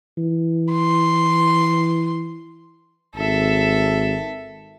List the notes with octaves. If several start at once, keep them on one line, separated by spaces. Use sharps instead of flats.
E3
C6
G#1 A4 E5